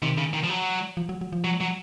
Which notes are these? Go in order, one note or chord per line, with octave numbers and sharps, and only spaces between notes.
C3 D#3
C#3
D#3
F3
F#3
F3
F#3
F#3
F3
F#3
F#3